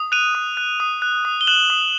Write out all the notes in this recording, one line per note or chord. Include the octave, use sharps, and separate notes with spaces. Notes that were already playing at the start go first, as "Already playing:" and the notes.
Already playing: D#6
F#6 D#7 F7
D#6
F#6
D#6
F#6
D#6
G7
F#6 E7 F#7
D#6